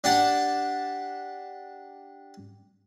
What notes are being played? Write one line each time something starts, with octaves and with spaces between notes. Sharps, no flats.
D4 G4 F#5 A5